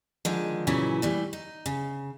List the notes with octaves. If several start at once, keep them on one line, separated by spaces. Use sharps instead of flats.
D3 D#3 F3 G#3
A#2 C#3 E3 F#3 C#4 E4
E3 G3 A3
D#4
C#3